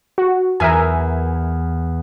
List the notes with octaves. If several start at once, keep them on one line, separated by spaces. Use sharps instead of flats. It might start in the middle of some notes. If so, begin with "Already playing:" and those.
F#4
E2 A#4 E5 G#5